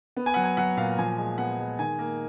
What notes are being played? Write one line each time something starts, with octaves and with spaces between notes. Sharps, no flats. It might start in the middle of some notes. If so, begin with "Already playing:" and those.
B3
G#5
F#3 F#5
G#5
F#3 F#5
A#2 F5
F3 G#5
G#3
B3 F#5
G#3
D#3 G#5
A#3